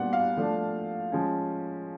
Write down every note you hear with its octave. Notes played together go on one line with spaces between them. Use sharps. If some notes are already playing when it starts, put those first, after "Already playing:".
Already playing: A#2 G3 B3 D4 F#5
F5
F3 A3 D4
F3 G#3 C#4